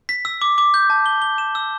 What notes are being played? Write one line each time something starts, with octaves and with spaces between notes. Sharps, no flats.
B6
E6
D6
D6
G6
A5
G7
G7
E7
E6